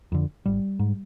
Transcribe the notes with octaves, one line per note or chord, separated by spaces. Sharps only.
F2 D3
G#1 G3
G#2